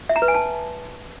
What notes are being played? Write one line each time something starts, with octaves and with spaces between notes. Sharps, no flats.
E5
A#5
B4
G#5
A5